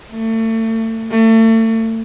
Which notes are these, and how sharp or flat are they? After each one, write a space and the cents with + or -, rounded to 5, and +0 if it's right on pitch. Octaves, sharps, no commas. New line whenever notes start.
A3 +35
A3 +35